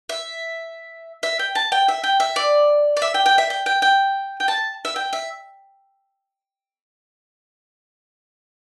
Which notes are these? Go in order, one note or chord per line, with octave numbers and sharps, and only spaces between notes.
E5
E5
G5
A5
G5
E5
G5
E5
D5
D5
E5
G5
G5
E5
G5
G5
G5
G5
A5
E5
G5
E5